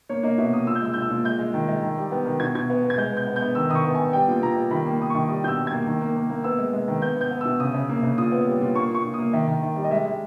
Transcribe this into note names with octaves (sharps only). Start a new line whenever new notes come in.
A#3 C#5
A#3 D#5
B2 E5
A#3 D#6
A#2 E6
G6
G#3 E6
A#2 G6
E6
A#2
G#3 G6
G#3
D#3
G#3
D#3
G3
B3
D#3
B2 G#6
B2 G#6
B3
B3
G#6
G#3 G6
B3 G6
B3
G6
B3
D#3 E6
D#3 D#6
C#6
B3
B3 G#5
G3 G5
A#2
A#2 A#5
G3
D#3 B5
A#3
B5
A#3 D#6
D#3 C#6
G3 D#6
B2 E6 G6
G3
G#6
A#3
D#3
A#3
A#3
A#3
B3 E6
G#3
G#3
D#3
B3 G6
B3 G6
B3
B2 E6
C#3 D#6
C#3
A#3
C#3
A#2 D#6
B3
G3
A#2
A#3 C#6
A#2 C#6
A#2
A#3 D#6
D#3 E5
D#3
D#3
G3
D#5
G#3 E5
G#3